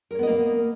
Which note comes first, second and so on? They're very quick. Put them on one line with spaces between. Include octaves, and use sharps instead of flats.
A#4 C#5 B3 D#5 A#3